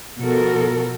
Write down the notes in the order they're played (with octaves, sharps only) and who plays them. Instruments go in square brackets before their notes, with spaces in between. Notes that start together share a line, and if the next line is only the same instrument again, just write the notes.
[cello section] B2 F3 F#4 A4 A#4